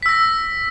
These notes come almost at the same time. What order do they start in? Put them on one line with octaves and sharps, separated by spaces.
B6 E6 A#6